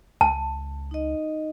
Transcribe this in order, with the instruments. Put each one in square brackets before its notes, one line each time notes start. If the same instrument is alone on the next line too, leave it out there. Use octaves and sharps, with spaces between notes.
[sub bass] C#2 [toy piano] A5
[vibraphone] D#4 D#5